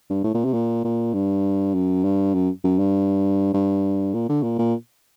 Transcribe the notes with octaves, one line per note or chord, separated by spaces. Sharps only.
G2
A2
A#2
C3
A#2
A#2
G2
F#2
G2
F#2
F#2
G2
G2
A#2
D3
A#2
A#2